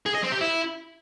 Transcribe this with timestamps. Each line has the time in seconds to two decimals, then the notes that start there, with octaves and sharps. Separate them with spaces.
0.06 G#4
0.15 D#5
0.23 C4
0.32 G4
0.41 E4